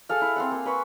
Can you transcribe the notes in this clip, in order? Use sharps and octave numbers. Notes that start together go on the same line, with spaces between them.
G#4 A4 F5
E4
C4 F5 F#5
A#3
B4 B5 C#6